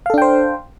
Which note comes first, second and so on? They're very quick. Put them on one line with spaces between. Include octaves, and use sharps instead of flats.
F5 A4 D4 G5 C5